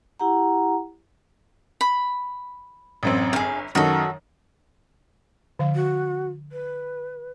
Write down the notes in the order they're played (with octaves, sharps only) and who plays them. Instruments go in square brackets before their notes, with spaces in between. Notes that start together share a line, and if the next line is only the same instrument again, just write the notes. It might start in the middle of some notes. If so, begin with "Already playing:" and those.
[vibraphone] E4 G4 F#5 A#5
[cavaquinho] B5
[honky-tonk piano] A1 F#2 C4
[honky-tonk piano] G1 [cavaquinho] G#4 F5
[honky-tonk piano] F#2 D#3 [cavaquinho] F#4 A4
[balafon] D3 F3 F5
[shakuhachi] F#4
B4